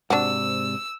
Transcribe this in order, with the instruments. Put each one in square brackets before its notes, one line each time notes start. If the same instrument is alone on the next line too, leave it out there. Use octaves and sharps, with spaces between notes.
[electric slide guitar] G#2 C3 D5 [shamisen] D4 F#4 [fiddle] E6